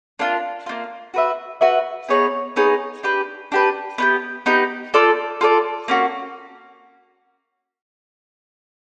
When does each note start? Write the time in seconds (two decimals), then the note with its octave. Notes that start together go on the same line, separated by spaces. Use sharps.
0.19 A#3 D4 F4
0.66 A#3 D4 F4
1.14 F#4 B4 E5
1.61 F#4 B4 E5
2.09 B3 D#4 G#4 C#5
2.56 B3 D#4 G#4 C#5
3.03 D4 G4 B4
3.52 D4 G4 B4
3.98 B3 D#4 G4
4.46 B3 D#4 G4
4.94 F4 A4 D5
5.41 F4 A4 D5
5.88 A#3 C#4 F#4